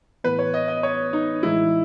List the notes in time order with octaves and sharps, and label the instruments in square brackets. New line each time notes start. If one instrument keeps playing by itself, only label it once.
[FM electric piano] A2 E3 B3 [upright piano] B4
[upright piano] C#5
D#5
D#5
C#5
D#4
[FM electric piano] A2 E3 G#3 D#4 [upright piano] E4